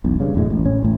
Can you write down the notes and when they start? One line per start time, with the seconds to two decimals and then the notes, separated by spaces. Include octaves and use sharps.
0.04 E1 B1
0.20 G2 C#3
0.35 E1 F#2 A2 G#3
0.50 A1
0.65 A2 C#4
0.83 A1 A2